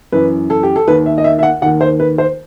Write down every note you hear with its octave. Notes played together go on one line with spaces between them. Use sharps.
F#2 E3 B4
A4
G4
A4
D#2 D#3 B4
E5
D#5
E5
E5
F#5
D#2 D#3 F#5
C5
B4
C5